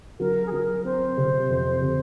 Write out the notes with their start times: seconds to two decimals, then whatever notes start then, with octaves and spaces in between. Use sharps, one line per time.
0.19 F#3 A#4
0.46 G#4
0.52 F#3 A#4
0.84 C4 C5
1.17 C3
1.49 F2
1.81 C3